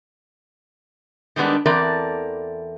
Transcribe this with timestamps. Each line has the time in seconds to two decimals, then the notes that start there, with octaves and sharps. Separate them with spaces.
1.36 D#3 G3 G#3 B3 D4
1.66 E2 E3 C4 A4 A#4 D5